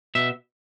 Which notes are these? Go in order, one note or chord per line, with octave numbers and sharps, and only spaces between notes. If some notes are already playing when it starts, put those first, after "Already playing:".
B2 E5